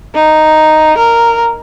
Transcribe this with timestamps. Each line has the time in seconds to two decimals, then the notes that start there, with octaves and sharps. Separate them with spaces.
0.15 D#4
0.97 A#4